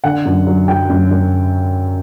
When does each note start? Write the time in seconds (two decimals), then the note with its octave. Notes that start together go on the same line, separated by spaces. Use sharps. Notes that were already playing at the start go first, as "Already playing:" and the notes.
0.04 D3 F#5
0.25 F#2
0.47 F#3
0.68 F#3 G5
0.90 F#2
1.11 F#2